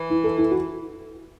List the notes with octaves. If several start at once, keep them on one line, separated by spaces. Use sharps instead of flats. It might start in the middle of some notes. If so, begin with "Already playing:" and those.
Already playing: E3
E4
A4
E4
F#4